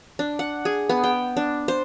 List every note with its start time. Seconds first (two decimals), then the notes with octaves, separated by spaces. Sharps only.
0.19 D4
0.39 F#5
0.65 G#4
0.89 B3
1.04 G5
1.37 D4
1.68 C5